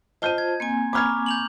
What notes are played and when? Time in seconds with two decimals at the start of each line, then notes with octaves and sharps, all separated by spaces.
0.22 F4 C5 D#5 A5 G6 D#7
0.38 G#6
0.60 A#3 C4 G#5
0.93 A#5 B5 C#6 D6 F6 G#6
1.26 G6 F7 F#7